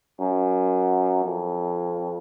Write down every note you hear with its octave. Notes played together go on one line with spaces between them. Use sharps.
F#2
F2